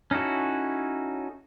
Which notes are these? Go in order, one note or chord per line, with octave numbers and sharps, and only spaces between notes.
C#4 D#4 E4 F#4 A4